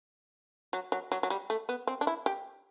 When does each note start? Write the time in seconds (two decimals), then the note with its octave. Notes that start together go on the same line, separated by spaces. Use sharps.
0.73 F#3
0.92 F#3
1.12 F#3
1.23 F#3
1.30 G3
1.50 A3
1.69 B3
1.87 C4
2.01 D4
2.07 E4
2.26 G4